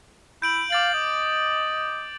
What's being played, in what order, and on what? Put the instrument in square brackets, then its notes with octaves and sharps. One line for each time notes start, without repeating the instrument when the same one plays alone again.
[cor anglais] E4 [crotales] G6 D7 F#7
[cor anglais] F5 [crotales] D6 A6 F#7
[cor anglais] D#5